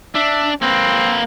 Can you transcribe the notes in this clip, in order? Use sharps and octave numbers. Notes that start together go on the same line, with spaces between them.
D4 E5
A#3 C4 B4